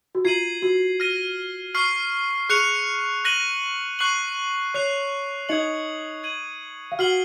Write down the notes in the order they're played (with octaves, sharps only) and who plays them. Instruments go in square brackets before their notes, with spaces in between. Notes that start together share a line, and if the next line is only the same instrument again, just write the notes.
[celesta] F#4
[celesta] F4 [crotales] G#6 C7 D#7 F#7
[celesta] F#4
[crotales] F6 A#6 D#7
C#6 F6 C7 F#7
[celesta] G#4 [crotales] C#6 F#6 C#7 F7
[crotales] F#6 A#6 D#7 F#7
C#6 F#6 C7 F#7
[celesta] C#5 [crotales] F#6 C7 F7
[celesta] D#4 D#5 [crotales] D#6 G#6 C#7 F#7
[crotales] G#6 D#7 F#7
[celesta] F5
[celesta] F#4 F#5 [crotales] F6 C7 F#7